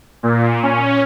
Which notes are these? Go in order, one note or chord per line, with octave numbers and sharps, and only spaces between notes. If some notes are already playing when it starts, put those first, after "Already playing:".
A#2
C#4